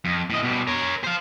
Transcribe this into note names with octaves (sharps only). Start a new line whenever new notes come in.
F2
A2 D#5
B2 G3
A#4 C#5
C5 F5